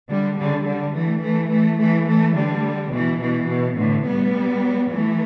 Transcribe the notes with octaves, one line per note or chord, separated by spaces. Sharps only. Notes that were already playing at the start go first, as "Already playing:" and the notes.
D3 G3
D3 G3
D3 G3
E3 A3
E3 A3
E3 A3
E3 A3
E3 A3
D3 G3
B2 E3
B2 E3
B2
A2 D3
G3 B3
E3 A3